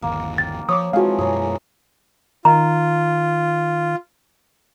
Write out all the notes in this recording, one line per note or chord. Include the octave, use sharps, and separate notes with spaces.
G1 D#2 A#3
G5 A6
F3 C#5 D6 D#6
E3 F3 G#3 C4 F#4 G#4 F5
F#2 B2 G#3 G#4 A#4 C#5
D#3 F4 A#5